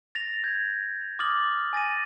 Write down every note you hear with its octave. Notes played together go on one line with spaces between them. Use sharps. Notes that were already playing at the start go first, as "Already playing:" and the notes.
A6 A#6 F7
G6 G#6
D6 D#6 F6 A6 F#7
G#5 A6 A#6 D#7